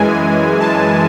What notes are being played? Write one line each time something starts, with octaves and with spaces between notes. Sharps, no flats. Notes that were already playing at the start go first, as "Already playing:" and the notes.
Already playing: F#2 E3 G#3 G#5
A5